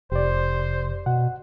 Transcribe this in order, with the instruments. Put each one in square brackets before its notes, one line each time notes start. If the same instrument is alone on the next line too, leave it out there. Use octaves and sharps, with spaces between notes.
[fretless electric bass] F1 [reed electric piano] G4 D5 [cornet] C5
[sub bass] B2 [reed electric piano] F#5